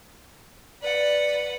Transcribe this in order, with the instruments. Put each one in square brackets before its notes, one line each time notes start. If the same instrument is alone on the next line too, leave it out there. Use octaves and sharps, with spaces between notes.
[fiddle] B4 F#5 [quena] D5